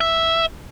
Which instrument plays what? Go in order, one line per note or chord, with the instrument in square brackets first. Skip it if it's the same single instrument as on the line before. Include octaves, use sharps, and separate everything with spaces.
[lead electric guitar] E5